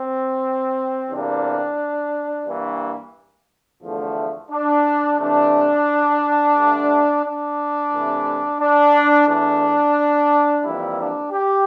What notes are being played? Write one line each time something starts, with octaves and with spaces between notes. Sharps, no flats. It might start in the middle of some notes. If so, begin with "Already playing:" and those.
Already playing: C4
E2 C3 G3 A#3 D4
G2 E3 A#3
E2 D3 F3 A3
D4
C3 E3 A3 D4
G2 D3 A3
D4
C3 E3 A3
D4
E2 E3 A3 D4
F2 E3 G3 A#3 E4
D4
G4